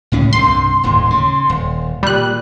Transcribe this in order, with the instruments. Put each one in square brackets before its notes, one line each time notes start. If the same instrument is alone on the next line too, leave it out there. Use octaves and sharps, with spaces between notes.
[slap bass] C#2 A2 C#4
[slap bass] C2 G2 C3 [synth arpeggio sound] C6
[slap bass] D#1 D#2 A2
C#3
D#1
[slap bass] A#2 [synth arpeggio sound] G3 F#6